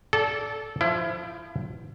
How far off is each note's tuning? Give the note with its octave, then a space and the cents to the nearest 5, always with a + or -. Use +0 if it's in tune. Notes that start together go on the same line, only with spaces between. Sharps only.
A4 -15 D5 -20
F3 +0 E4 +25